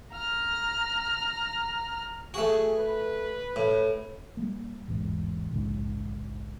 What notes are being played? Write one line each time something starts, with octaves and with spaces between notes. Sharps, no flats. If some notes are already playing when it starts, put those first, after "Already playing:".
A#5 F6
A3 F#4 G#4
B4
A2
G3 A3 A#3
A1 E2 G#2
A#1 D#2 G#2 C#3